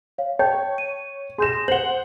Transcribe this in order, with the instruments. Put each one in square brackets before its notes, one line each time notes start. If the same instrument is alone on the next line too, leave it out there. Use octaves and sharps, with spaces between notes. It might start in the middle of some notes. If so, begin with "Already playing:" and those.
[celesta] C#5 F5
[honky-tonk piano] C#5 [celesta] G5 A5 G6
[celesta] D#7
[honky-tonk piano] G#4 E7 [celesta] C6 G6 A#6
[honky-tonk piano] C5 F#5 [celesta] F#7 G7